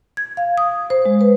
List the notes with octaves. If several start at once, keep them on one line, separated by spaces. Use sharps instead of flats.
G#6
F5
D#6
C5
G#3
B4